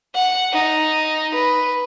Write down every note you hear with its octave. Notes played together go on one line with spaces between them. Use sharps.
F#5
D#4
B4